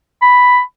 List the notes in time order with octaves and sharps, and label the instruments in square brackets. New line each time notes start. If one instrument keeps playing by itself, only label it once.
[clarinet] B5